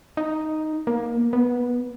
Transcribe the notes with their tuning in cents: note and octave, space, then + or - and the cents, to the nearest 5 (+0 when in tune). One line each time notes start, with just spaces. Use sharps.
D#4 +0
A#3 +20
B3 -15